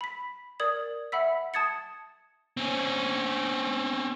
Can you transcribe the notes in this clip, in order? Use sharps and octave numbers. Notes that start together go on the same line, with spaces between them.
B5 B6
A#4 D5 D#6 G#6 F#7
E5 F#5 B5 E6 B6
A5 D#6 G#6 A6 C#7
C4 C#4